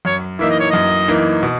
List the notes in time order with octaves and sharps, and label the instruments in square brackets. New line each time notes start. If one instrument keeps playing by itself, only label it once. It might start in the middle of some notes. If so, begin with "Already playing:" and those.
[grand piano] F#2 [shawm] C#5
[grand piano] E3 A#3 D#4 [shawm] E5
[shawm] D#5
C#5
[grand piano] F#2 [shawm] D#5
[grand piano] E3 A#3 D#4
B2